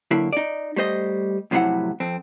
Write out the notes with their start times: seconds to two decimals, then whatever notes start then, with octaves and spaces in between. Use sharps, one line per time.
0.11 D3 F#3 A#3 E4
0.33 D#4 D5
0.76 G3 A3 C5 D#5
1.51 F2 A2 C3 F#3 E4 F#5
2.00 F2 C4